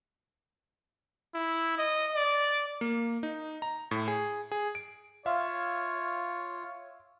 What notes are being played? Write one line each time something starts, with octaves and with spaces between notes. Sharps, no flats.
E4
D#5
D5
A#3
D#4
A#5
A2
G#4
G#4
D7
F4 C#5 E5 F5